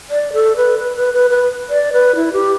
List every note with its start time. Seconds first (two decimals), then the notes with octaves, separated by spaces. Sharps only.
0.10 D5
0.33 A4
0.56 B4
0.79 B4
0.96 B4
1.14 B4
1.30 B4
1.70 D5
1.93 B4
2.16 E4
2.33 G4